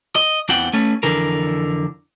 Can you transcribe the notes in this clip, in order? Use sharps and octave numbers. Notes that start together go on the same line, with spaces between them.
D#5
E2 E3 C4 F#5 G5
A3 C#4
F2 D3 E3 A#4